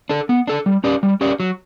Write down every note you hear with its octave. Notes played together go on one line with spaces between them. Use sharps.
D4 A4
B3
D4 A4
G3
C#4 G4 D5
G3
C#4 G4 D5
F#3